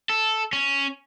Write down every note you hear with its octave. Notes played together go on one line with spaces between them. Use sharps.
A4
C#4